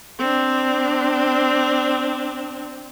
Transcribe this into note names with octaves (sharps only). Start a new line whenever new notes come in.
C4 D4